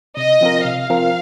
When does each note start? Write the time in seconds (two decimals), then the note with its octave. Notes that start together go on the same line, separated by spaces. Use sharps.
0.17 C3 D#5
0.41 F3 C4 F4 A#4
0.65 C3 F5
0.90 F3 C4 F4 A#4